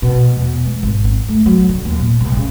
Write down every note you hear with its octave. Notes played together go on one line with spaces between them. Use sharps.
B2
E2
G#3
G#1
C4
A3
F#3
D3
D#2
A#2
C2
C#3